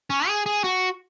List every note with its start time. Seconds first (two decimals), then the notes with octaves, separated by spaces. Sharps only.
0.10 C#4
0.28 G#4
0.46 G#4
0.64 F#4